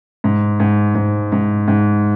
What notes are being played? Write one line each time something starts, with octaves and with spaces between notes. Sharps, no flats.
G#2
G#2
G#2
G#2
G#2